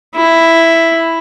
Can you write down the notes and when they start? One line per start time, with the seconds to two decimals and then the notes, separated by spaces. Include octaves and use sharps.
0.15 E4